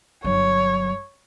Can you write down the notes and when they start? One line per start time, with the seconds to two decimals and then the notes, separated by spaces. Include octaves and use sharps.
0.24 G1 F#3 C#5